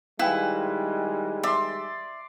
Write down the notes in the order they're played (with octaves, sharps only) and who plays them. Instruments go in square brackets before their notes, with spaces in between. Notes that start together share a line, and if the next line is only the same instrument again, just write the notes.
[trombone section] D#3 G3 G#3 [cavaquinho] E4 [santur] B4 [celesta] F5 G5 G#5
[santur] D5 C6 [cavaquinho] E5